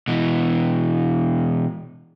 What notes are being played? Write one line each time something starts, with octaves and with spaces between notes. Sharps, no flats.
B2 E3